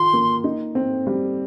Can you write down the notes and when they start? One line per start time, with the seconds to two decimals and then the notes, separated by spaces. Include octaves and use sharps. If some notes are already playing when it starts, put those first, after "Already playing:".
Already playing: D#3 F4 C6
0.13 A#3
0.44 D#4
0.75 C4
1.07 G3